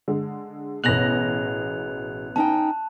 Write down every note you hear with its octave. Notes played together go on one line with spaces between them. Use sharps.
D3 G#3
A1 B2 G#4 F#6 A#6 F7 F#7
C#4 D#4 G5 A5